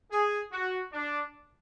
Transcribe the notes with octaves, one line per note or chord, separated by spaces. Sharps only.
G#4
F#4
D4